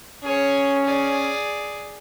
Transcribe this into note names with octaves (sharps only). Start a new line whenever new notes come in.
C#4 G#4 C#5
G#4 D5